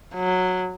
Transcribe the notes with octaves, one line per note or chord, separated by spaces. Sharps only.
F#3